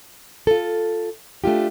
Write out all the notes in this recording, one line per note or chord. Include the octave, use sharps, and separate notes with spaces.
F4 A4
A3 D4 F4 G4